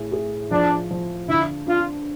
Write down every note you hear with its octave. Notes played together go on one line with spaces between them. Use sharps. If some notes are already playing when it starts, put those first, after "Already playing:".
Already playing: A2 G#4
G#4
F3 D4
F3
D3 E4
D4 F4